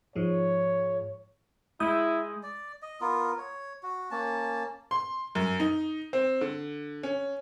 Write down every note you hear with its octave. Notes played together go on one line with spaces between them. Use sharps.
G#2 F3 G#3 C#5
G#3 E4 D#6 G6
D5
D#5
B3 F4 A#4
C#5
F#4
A#3 C#4 A5
C6
F#2
D#4
C4
D3
C#4